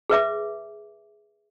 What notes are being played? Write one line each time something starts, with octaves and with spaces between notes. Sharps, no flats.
G#4 B4 E5 D6